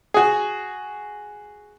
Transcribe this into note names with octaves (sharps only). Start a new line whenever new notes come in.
F#4 G#4